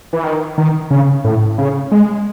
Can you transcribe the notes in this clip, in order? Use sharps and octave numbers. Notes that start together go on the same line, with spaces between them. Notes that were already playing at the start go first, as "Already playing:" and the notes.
E3
D#3
D#3
C#3
A2
C#3
G#3